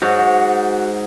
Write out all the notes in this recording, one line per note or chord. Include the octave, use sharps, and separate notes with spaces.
G#2 F#4 C#5